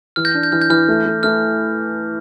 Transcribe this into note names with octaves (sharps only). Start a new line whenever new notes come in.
E3 F6
G6 A#6
D4
G6
E3 F6
G6
E3 F6
A3
A3
A3 F6